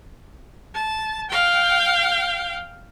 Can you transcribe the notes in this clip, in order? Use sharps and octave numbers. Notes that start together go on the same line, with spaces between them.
A5
F5 G5